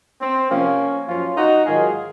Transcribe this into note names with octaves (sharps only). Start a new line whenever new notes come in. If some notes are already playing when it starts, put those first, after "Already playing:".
C4
C3 F3 A#3 C#4
F#2 F3 C#4 F4
D#4 F#4
G#2 D#3 F#3 F4 G#4